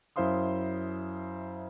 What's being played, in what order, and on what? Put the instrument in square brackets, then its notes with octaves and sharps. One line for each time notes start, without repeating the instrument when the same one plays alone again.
[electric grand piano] F#2 E4 C5 F5 C6 D#6